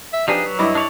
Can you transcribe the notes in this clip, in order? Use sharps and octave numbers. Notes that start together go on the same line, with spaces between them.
E5
F3 D4 D#4 G4 G#4 B4
F#3
G2 E4 B4 D#5 D6
D4 C#5 D5